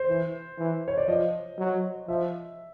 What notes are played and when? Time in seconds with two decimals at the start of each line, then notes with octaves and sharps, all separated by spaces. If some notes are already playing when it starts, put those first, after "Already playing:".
Already playing: C5
0.08 E3
0.58 E3
0.88 C#5
0.98 D5
1.08 F3 D#5
1.59 F#3
2.08 F3 E5